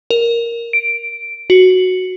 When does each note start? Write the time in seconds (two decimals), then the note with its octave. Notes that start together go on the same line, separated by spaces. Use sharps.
0.10 A#4
0.73 D7
1.50 F#4